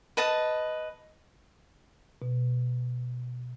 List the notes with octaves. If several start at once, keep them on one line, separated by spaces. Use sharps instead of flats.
B4 D#5 A5
B2